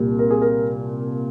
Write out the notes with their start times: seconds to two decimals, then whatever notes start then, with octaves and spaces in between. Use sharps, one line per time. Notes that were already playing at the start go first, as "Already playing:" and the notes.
Already playing: C2 A#2 G3
0.19 A#4
0.30 G#4
0.42 A#4